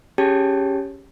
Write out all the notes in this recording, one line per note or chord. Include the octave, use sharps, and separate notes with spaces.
C#4 G4 G#4 C#5 G5 A5